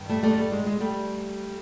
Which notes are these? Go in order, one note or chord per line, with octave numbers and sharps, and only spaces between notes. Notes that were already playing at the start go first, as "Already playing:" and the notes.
Already playing: G2 D#3
G3 A3
G3 A3
G#3
G3
G#3
G#3
G3 A3